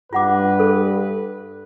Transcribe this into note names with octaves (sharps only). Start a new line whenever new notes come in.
G2 F4 B4 F#5 D6
A4